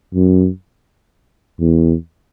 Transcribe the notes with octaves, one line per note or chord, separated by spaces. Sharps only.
F#2
E2